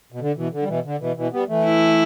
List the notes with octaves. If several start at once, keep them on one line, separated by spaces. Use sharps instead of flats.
B2
D3
B2 E3
D3
G3
B2 E3
D3
B2 E3
B2 E3
G3 B3
E3 A3
E4